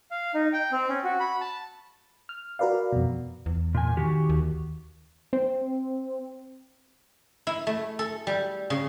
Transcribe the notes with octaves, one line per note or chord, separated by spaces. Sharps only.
F5
D#4
G5
C4
C#4
F#4
B5
A5
F6
F#4 A#4 B4 D5 F5
F2 B2
E2
A#2 G#5
D#3 F#4 G4
D#2
C4
E4
A3
A4
G3
C#3